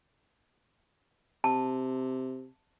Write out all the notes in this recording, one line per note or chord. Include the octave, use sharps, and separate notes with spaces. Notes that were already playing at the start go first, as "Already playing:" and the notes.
C3 A5